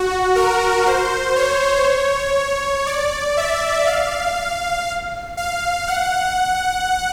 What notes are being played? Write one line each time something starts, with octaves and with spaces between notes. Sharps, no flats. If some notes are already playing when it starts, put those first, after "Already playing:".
Already playing: F#4
A#4
C5
C#5
D5
E5
F5
F5
F#5